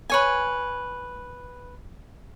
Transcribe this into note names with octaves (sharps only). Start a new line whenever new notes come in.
B4 C#5 G#5